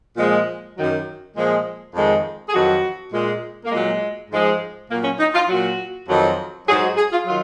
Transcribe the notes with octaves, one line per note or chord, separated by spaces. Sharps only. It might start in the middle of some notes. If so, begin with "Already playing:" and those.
A#2 F3 G#3
F#2 D#3 F#3
A#2 F3 G#3
F2 D#3 G#3
G#4
F2 D#3 F#3 F#4
A#2 G#3
A#3
A#2 F#3 G#3
G#2 F3 G#3
A#2 F#3 A#3
C#4
D#4
F4
A#2 F#3 F#4
F2 D#3 F#3
G#2 F#3 G#4
F#4
G#4
F4
D#3 F#3 F4